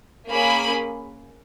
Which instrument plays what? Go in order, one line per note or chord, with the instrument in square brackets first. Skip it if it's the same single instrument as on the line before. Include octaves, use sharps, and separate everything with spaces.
[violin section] A#3 C#4 G#4 B5